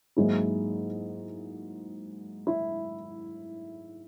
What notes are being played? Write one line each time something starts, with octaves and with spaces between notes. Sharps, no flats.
G#2 F#3 A#3 E4 G#4
E4